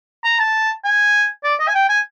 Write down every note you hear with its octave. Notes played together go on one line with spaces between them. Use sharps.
A#5
A5
G#5
D5
D#5
G#5
G5
G#5